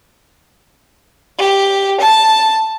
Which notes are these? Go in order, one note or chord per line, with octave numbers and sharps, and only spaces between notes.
G4
A5